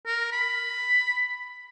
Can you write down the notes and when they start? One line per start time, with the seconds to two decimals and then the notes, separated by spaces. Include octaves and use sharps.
0.06 A#4
0.32 B5